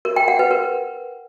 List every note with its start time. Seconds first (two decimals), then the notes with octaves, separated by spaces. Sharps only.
0.05 A#4
0.16 G5
0.28 F#5
0.39 B4
0.51 A#4